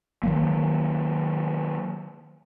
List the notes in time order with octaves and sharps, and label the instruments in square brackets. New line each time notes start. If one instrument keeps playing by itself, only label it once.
[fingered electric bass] D#3 F#3 A#3